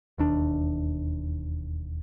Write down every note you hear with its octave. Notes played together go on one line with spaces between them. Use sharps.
E1 D#2 D4